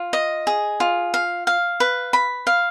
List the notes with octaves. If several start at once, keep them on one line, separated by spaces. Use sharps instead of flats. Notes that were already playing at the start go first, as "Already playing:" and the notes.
Already playing: F4
D#5
G#4
F4
F5
F5
B4
B5
F5